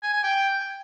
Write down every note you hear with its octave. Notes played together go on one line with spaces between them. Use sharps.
G#5
G#5
G5